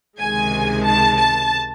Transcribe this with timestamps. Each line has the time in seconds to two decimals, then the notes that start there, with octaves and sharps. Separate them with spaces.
0.20 C#2 C3 D#3 G#3 G#5
0.86 A5
1.18 A5